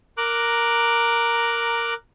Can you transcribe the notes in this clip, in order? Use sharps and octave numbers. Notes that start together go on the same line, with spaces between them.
A#4 A#5 D6 F#6